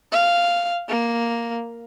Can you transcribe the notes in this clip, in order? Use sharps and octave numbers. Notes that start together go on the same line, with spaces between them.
F5
A#3